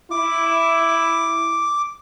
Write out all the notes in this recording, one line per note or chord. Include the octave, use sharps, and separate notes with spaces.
E4 D6